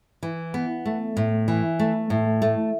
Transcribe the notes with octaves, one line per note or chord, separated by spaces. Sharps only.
E3
B3
A3
A2
E3
A3
A2
A3